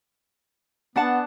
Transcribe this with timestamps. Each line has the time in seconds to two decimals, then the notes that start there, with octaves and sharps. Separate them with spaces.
0.96 B3 D4 F#5 A5